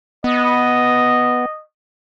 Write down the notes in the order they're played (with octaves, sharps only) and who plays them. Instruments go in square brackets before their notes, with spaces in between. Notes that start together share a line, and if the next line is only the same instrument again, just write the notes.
[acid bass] B3 [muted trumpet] D#5